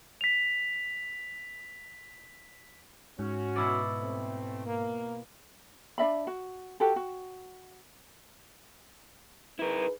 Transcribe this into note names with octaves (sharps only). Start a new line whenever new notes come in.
B6 F7
G#2 C#4 F#4
B2 E4 D5
A3 C4
A#3
D4 D5 E5 B5
F#4
F#4 G4 A4
F#4
D#4 E4 G#4 A#4 B4